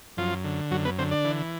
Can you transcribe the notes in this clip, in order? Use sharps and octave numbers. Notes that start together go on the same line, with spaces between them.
F#2 F3 F4
D3
F#2 F#3 F#4
B3 B4
D3 C4 C5
D4 D5
E3